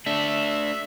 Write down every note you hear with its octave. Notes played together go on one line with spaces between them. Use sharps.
A3 D4 E5